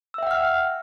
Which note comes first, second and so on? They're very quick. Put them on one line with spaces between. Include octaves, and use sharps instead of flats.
E6 E5 G5 F#5 F6